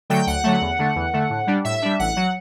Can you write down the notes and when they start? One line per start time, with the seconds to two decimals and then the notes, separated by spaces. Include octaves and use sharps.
0.10 D3 F#3 A3 G5
0.27 D2 F#5
0.44 D3 F#3 A3
0.61 E2
0.79 D3 A3
0.95 E2
1.13 D3 A3
1.30 A2
1.47 G3 D4
1.64 A2 E5
1.82 G3 D4
1.99 A1 F#5
2.16 F#3